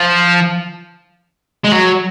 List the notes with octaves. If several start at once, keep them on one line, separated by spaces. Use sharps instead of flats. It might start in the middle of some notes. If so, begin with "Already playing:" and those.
Already playing: F3
G#3
F#3